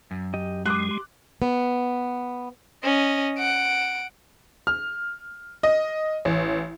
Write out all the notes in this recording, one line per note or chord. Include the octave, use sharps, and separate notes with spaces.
F#2
G4 D#5
G#3 G4 C6 D6 D#6 F#6
G4 C6
B3
C#4 D#5
F#5 D7
F6
D#5
A1